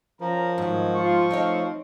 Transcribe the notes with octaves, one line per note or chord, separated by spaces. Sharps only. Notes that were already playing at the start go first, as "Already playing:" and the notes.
F3 C#4 A#4 A#5
G#2 D#3 F#3
F4 C#6
A3 C4 D#4 A4 C#5 F5